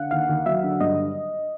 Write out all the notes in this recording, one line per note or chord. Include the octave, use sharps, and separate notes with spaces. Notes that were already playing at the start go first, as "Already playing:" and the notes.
Already playing: D3 F5 F#5
D#2 F5
D#2
F#3 E5
D3
G2 D#5